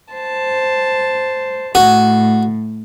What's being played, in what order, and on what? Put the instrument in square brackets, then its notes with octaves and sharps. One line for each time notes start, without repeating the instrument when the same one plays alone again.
[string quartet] C5 A5
[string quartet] A2 [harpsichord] F#4